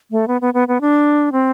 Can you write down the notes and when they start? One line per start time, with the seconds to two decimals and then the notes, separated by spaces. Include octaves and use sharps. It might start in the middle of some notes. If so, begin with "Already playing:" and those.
0.11 A3
0.28 B3
0.41 B3
0.54 B3
0.68 B3
0.81 D4
1.32 C4